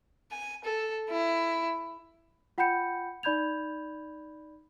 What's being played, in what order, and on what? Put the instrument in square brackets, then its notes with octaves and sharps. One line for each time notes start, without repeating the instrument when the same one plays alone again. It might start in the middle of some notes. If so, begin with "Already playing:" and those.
[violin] G#5
A4
E4
[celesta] F4 F#5 G5 B5 G6 C#7
D#4 D5 B5 G6 G#6 F7